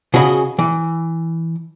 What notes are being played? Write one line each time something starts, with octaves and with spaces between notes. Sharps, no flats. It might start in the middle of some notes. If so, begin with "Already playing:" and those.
C#3 F#4 G#4 D#5 B5
E3